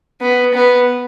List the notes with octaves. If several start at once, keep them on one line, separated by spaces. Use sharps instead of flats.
B3
B3